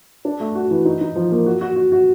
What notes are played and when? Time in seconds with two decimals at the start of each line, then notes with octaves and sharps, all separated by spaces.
0.25 D4
0.40 A3
0.55 F#4
0.71 E3
0.85 D#4
1.01 D#4
1.16 F3
1.32 A#3
1.46 F#4
1.61 F#4
1.76 F#4
1.92 F#4